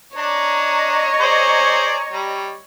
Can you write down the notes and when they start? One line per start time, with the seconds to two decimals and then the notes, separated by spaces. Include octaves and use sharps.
0.17 D4 C#5 D#5 A#5
1.20 G#4 C5 D5
2.12 G3